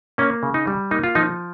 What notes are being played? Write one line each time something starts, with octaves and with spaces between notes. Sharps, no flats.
A#3 C#4
C#3
D#4
G3
A#3 D#4
F4
F3 D#4